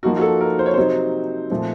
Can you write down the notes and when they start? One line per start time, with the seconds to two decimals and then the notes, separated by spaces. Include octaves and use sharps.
0.03 F3 A#3 D#4 F#4
0.17 F#4
0.21 A4
0.41 A#4
0.59 C5
0.66 C#5
0.74 C3 F#3 C4 D#4 C5
1.50 A#2 F3 A3 C4